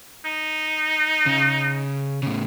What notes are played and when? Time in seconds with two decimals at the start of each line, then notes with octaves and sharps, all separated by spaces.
0.25 D#4
1.26 C#3
2.23 A2 C#3